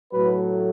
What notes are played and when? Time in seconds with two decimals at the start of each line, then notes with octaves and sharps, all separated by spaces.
0.12 A2 F#3 A3 B4